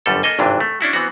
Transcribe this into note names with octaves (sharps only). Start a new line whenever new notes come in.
G1 F#2 G3 A4
A#3 A4 D#5 G#5
G#1 G2 C3 E3 D4
A3
C#4 D4 E4 F#4
E3 B3 C4 F#4